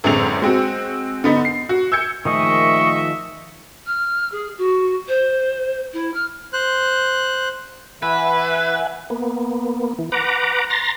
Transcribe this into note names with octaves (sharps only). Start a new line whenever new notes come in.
A1 F#2 D3 G#3 C4 F7
G#3 C4 F#4
D3 B3 D#4
C7
F#4
E6 G6 G#6 C#7
A#2 D#3 F3 A3 G#4 D#5 E5 C#6
F6
G#4
F#4
C5
E4
F6
C5 F#6
E3 B4 E5 F#5 G#5
A#3 B3
E3
B4 F#5 A#5 D6
A#5 C6 A6 A#6